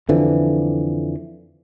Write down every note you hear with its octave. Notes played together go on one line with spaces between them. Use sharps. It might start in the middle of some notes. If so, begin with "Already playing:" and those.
F2 D3 E3 F3